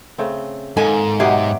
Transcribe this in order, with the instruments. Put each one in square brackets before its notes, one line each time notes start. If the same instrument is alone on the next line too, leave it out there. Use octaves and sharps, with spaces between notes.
[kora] C#3 A3 C4
[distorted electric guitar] G#2 [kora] D#3 A#3 [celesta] A4 [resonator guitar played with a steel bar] G#5
[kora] B2 F#3 [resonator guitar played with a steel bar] G#3 G4 [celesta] E5